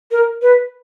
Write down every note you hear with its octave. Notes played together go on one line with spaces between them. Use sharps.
A#4
B4